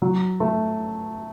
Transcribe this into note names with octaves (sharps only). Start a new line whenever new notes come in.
F#3
A3